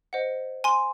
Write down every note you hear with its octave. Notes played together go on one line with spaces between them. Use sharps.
C5 D#5 F#5
G#5 C6